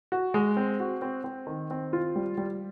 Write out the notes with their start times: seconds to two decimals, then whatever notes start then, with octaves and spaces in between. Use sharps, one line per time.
0.12 F#4
0.34 G#3
0.57 C4
0.80 F#4
1.02 C4
1.24 C4
1.47 D#3
1.71 C4
1.93 F4
2.16 G3
2.37 G3